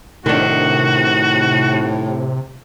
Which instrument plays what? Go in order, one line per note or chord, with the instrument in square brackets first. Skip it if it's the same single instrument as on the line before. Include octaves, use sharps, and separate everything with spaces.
[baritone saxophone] A2 [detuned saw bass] C3 [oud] D#3 D4 [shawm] F#4